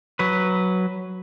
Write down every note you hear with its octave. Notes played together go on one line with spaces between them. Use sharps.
F#3 B4